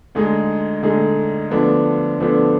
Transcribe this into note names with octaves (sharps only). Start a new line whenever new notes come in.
D2 D3 G#3 D#4 G#4
D2 D3 G#3 D#4 G#4
D2 D3 F3 B3 D4
D2 D3 F3 B3 D4